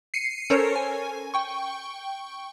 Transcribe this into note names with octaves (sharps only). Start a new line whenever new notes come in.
C7 C#7 D#7
C#4 A4 A#4 C5 C#5
G#5
G5 C#6